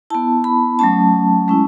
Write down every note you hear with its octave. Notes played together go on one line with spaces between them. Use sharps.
B3 E4 A5
B5
F#3 A3 C#4 A5
G#3 C#4 E4